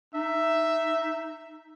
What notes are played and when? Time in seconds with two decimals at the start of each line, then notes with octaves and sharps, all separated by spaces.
0.15 D#4 E5